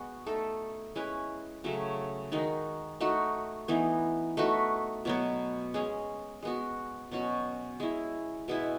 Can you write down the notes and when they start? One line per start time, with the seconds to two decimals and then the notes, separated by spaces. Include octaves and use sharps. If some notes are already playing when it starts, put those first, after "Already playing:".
Already playing: G#3 B3 F#4
0.26 A3 D#4 A4
0.95 G#3 C#4 E4 B4
1.64 C#3 F#3 A3
2.32 D#3 G#3 D#4 F#4
3.01 A3 D#4 F#4
3.68 E3 B3 D#4
4.37 A3 D#4 F#4 B4
5.05 B2 F#3 B3
5.74 G#3 C#4 G#4
6.43 G#3 B3 F#4
7.12 B2 F#3 C#4 F#4
7.80 G#3 C#4 E4
8.48 B2 G#3 B3 E4